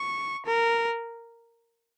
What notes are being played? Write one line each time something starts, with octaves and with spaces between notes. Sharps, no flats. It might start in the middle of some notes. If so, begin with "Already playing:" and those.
Already playing: C#6
A#4